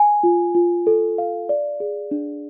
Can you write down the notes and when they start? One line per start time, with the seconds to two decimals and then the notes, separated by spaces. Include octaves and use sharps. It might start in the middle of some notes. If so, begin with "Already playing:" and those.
Already playing: G#5
0.23 F4
0.55 F4
0.87 A4
1.18 F5
1.49 D5
1.80 G#4
2.11 D4